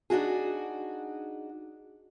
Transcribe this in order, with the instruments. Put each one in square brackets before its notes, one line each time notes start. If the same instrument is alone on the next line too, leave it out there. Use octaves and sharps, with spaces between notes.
[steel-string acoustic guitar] D4 D#4 F#4 G#4